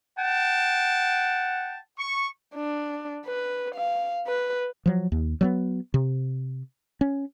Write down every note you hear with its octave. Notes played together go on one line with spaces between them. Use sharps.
F#5 G5 A5
C#6
D4
B4
F5
B4
F3 F#3
D#2
F#3 G#3 B3
C3
C#4